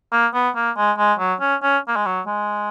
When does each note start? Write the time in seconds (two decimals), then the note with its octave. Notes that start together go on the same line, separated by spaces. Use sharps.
0.12 A#3
0.34 B3
0.56 A#3
0.77 G#3
0.98 G#3
1.19 F#3
1.40 C#4
1.63 C#4
1.88 A#3
1.96 G#3
2.06 F#3
2.26 G#3